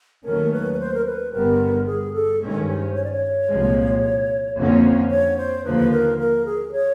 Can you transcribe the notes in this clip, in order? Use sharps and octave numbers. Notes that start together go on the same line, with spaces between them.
D#2 D#3 F#3 A3 C#4 A#4
B4
B4
C5
A#4
B4
G1 G2 D3 G3 B3 A#4
G#4
A4
G2 D#3 G#3 C#4
C5
C#5
D5
C#5
C2 A#2 F3 G#3
F2 D3 F3 A#3 C#4
C#5
C5
D#2 D3 F3 A#3 B4
A#4
A#4
G#4
C#5